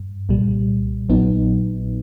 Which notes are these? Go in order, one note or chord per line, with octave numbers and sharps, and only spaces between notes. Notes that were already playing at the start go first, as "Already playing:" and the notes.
Already playing: G2
C2 A#2 G3
A#1 A#2 F#3 B3 D#4